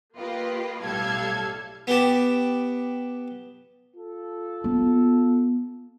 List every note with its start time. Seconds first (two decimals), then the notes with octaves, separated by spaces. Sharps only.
0.17 A#3 F4 G4 B4 D#5
0.82 B1 A2 G3 A4 F5 G#6
1.87 B3 G4 A5
3.97 F4 A4
4.64 B3